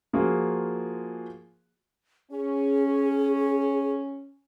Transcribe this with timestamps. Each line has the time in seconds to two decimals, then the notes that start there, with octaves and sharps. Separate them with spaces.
0.13 F3 A#3 F4 F#4 G#4
2.32 C#4 G#4